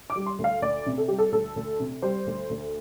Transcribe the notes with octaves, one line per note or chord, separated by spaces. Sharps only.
D6
G3
C6
D2
F5
D2 D5
C3
A4
G3 G4
A4
D2 A4
D2
C3
G3 C5
D2
D2